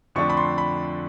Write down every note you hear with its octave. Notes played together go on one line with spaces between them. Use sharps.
F2 D3 F3 A3 D4 C#6
B5
C6
B5